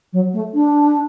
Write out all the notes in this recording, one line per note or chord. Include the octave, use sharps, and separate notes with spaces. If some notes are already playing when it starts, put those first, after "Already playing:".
F#3
A3
D4